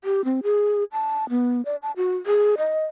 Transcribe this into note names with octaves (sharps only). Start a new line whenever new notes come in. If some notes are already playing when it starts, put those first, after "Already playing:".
G4
C4
G#4
A5
B3
D5
A5
F#4
G#4
D#5